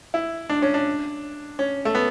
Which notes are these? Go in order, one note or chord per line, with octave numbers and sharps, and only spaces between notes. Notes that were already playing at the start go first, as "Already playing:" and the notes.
E4
D4
C#4
D4
C#4
A3
B3